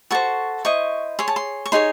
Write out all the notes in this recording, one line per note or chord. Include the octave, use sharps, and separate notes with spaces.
F#4 A4 C5 C#6
E4 C5 D#5 C#6
G#4 C#5 C6
A5
C6
C#6
D#4 G#4 C#5 C6